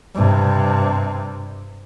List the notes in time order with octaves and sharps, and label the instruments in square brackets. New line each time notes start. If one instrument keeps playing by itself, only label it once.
[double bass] G2 C3